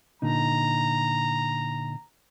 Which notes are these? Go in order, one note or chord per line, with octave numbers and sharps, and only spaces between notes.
A#2 D3 D#4 A#5